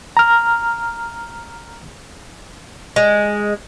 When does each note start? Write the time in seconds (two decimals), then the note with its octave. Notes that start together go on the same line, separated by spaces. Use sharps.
0.17 A#5 F6
2.96 G#3